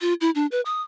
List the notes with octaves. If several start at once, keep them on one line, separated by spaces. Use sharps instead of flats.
F4
E4
D4
B4
D#6